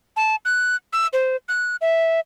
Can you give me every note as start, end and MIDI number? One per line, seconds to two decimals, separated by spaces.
0.16 0.35 81
0.45 0.76 90
0.93 1.07 88
1.13 1.36 72
1.48 1.76 90
1.81 2.20 76